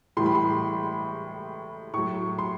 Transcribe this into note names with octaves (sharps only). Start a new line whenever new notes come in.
A2 E3 G3 C6
B5
C6
A2 F#3 C#6
C6